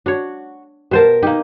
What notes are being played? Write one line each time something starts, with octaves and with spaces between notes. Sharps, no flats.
D4 F#4 C#5
B2 G4 G#4 A#4 C5 A5
A#3 D#4 G4